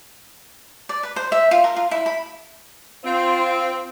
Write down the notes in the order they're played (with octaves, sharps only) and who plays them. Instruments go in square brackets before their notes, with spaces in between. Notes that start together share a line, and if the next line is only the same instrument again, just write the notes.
[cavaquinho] D5
B4
C5
E5
F4
A#4
F4
E4
B5
[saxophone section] C4 [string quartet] F4